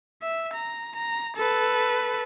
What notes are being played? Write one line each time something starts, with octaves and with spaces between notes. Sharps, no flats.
E5
A#5
A#5
A4 B4